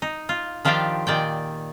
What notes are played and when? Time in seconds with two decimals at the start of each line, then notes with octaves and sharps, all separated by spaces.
0.02 D#4
0.29 F4
0.65 D#3 F3 D4 G4 F5 G5
1.07 A#2 D#3 D5 G5